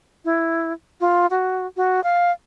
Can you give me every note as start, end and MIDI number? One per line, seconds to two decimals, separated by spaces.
0.25 0.73 64
1.00 1.26 65
1.30 1.66 66
1.77 2.03 66
2.04 2.31 77